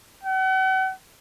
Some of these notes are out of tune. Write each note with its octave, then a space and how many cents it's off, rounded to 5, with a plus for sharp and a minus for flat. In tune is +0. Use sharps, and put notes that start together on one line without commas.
F#5 +40